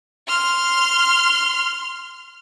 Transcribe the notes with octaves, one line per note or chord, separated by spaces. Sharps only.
C6 F6